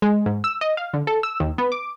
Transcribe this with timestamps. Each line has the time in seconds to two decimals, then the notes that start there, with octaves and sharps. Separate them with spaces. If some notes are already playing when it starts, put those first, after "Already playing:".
0.02 G#3
0.26 G#2
0.44 E6
0.61 D#5
0.77 F5
0.94 D3
1.07 A4
1.23 E6
1.40 D#2
1.58 B3
1.72 D6